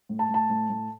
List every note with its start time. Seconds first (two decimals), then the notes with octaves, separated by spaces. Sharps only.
0.09 A2
0.19 A5
0.29 A2
0.34 A5
0.49 A2
0.70 A2